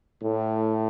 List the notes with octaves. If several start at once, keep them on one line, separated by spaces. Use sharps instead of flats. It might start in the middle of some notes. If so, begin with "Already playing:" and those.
A2